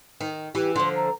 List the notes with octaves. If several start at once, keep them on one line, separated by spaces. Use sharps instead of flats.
D#3
E3 G4
D3 F3 C6
A#5